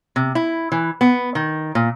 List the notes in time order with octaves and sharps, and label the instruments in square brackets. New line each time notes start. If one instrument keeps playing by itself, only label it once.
[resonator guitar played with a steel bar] C3
E4
E3
B3
D#3
A#2